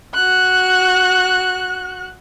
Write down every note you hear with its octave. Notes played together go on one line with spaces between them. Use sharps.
F#4 F#6